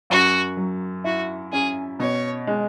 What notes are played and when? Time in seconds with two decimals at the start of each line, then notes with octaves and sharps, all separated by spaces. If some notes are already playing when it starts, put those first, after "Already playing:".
0.10 F#2 F#4
0.57 F#3
1.04 E4 F#4
1.52 C#4 G#4
1.99 B2 C#5
2.47 G#3